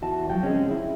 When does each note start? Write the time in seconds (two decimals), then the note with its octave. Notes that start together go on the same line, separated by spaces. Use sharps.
0.02 E2 E3 F#4 A5
0.30 F3 F#3 F#4 G5
0.43 C#3 G#3 C4 C#4
0.71 E4